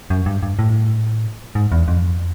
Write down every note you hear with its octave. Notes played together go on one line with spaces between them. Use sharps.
F#2
G2
G2
A2
G#2
E2
F2